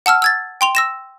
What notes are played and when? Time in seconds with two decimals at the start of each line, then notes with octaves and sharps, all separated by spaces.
0.06 F#5 A5 E6 F6
0.22 E6 G#6 A6
0.61 G5 C6 F7
0.75 E6 A#6 E7